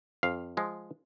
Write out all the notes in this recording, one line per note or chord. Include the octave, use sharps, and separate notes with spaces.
F2 F5
F3 G#3